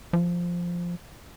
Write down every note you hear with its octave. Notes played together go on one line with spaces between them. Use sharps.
F3